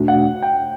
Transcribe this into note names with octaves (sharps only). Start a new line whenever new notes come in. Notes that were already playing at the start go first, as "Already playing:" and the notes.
Already playing: E2 B2 A3 D4 F#4
F#5
G5